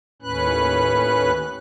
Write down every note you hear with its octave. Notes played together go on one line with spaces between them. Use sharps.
D#2 A2 C#4 B4 F#6